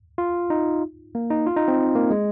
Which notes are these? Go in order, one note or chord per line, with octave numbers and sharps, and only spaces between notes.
F4
D#4
A#3
D#4
F4
D#4
C4
A#3
G#3